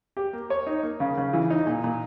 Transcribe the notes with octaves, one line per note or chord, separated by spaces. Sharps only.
G4
A#3
C#5
D#4
A#3
C#3
C#3
E3
D#4
A#2
A#2